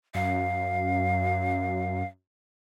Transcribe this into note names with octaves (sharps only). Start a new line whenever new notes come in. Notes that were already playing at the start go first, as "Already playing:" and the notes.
F#2 F5